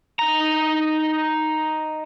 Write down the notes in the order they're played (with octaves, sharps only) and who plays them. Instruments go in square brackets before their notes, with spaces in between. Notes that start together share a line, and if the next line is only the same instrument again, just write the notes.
[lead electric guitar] D#4 A#5